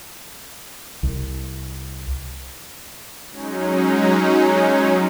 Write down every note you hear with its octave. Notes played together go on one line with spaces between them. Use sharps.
C2
F#3 G#3 C#4 D#4